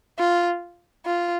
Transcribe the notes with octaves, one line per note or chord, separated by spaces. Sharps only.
F4
F4